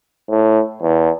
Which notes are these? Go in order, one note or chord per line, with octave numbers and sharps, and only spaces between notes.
A2
E2